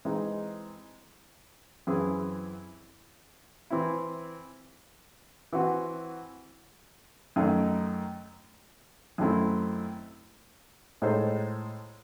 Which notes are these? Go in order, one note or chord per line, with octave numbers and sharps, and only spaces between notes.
E3 G#3 C4 D#4
F#2 E3 C4 E4 G#4
E3 C4 E4
E3 C4 F#4
F#2 D#3 A3 D#4
F#2 D#3 A3 C4 E4
A2 G#3 D#4 A4 C5